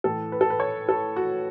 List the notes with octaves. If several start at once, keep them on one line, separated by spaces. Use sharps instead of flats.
A2 E3 A4
B4
A4
B4
C#5
A4
F#4